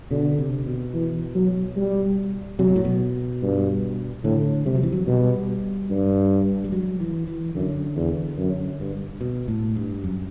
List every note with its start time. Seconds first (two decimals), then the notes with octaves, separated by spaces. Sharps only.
0.11 B2 D3
0.38 C3
0.66 B2
0.94 E3
1.35 F#3
1.76 G3
2.59 C3 F#3
2.68 B2
2.76 A2
2.85 B2
3.42 G2
4.24 A2 D3
4.65 C3 G3
4.75 F#3
4.83 E3
4.92 F#3
5.07 B2 G3
5.90 G2
6.64 G3
6.72 F#3
7.00 E3
7.27 E3
7.55 F#2 D3
7.96 E2
8.38 F#2
8.80 G2
9.21 B2
9.48 A2
9.76 G2
10.04 F#2